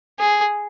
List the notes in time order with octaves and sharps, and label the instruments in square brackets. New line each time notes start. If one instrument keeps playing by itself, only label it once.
[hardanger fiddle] G#4